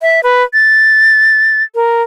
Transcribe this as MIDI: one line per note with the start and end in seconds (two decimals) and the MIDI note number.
0.02 0.20 76
0.23 0.43 71
0.54 1.63 93
1.75 2.02 70